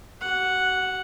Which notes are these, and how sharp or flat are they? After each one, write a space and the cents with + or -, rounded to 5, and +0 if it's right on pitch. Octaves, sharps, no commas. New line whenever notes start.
F#4 +40 F#5 -5